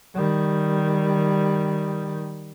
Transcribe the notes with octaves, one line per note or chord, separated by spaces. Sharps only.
D#3 G3